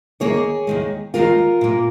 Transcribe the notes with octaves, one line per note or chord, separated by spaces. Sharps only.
D#2 D#3 A#3 G#4 C#5
D#2 D#3 G#3
D#2 D#3 G#3 F4 A#4
A#2 A#3